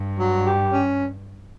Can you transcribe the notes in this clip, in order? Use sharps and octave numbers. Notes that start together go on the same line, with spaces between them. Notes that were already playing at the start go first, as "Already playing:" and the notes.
Already playing: G2
F#3
G4
C#4